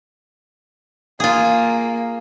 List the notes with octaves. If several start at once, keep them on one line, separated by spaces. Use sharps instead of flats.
A#3 F4 G#4